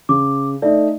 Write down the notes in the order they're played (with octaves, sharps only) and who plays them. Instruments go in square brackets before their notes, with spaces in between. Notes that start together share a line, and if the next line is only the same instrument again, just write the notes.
[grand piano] C#3 [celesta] D6
[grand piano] A3 D#4 [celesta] D5 E5